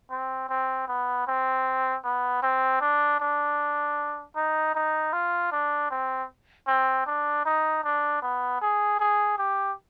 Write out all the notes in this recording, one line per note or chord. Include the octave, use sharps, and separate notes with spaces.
C4
C4
B3
C4
B3
C4
D4
D4
D#4
D#4
F4
D4
C4
C4
D4
D#4
D4
B3
G#4
G#4
G4